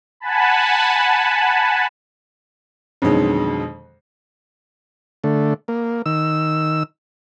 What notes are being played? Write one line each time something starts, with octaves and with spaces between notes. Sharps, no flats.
F#5 G#5 A5 B5
F2 B2 D3 D#3 F#3 G#3
D3 A3
A#3
D#3 E6